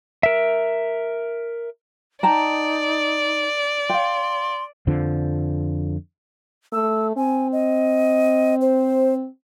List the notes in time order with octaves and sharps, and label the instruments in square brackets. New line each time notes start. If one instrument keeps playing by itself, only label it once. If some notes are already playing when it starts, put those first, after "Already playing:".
[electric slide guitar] A#4 E5
[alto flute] D#4 [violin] D5 [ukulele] G5 A5 A#5
[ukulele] F5 G5 [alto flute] C6
[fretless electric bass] F2 D3 F3
[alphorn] A3 [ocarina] E6
[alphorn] C4 [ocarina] G#5
[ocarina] D#5
C5